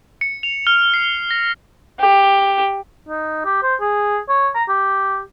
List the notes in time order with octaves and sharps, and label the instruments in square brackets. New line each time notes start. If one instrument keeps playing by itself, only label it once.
[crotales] C#7
F7
F6
C7
A#6
[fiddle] G4
[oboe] D#4
G4
C5
G#4
C#5
A#5
G4